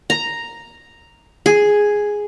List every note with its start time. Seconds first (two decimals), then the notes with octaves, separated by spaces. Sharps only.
0.10 A#5
1.46 G#4